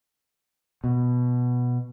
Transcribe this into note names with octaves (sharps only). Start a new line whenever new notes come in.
B2